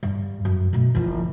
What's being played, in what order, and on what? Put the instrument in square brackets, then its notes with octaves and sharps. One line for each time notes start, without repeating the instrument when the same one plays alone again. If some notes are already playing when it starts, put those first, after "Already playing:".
[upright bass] G2
F#2
B2 A3
F#1 F3